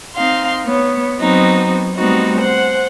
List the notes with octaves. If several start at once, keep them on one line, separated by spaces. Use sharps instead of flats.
C4 D#4 F5 C6
B3 C#5
F#3 B3 C4 D#4 F#4
G3 A3 B3 C4 D#4 F#4
C5 F#5